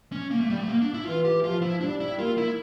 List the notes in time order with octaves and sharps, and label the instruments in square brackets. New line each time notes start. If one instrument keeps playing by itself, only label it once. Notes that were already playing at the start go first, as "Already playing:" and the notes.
[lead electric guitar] C#4
A#3
A3
G3
A3
A#3
D4
E4
[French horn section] E3 [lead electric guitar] F4
[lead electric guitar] G4
[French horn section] F3 [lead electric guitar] F4
[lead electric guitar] E4
[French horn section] G3 [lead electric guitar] D4
[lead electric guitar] E4
[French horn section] A#3 [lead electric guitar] F4
[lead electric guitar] E4